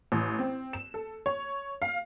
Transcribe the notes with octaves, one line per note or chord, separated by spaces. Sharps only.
A1
C4
E7
A4
C#5
F5